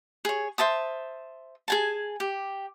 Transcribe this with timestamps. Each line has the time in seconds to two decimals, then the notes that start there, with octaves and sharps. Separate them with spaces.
0.25 G#4 C#5
0.58 C5 E5 A5 D#6
1.68 G#4 G#5 A5
2.20 G4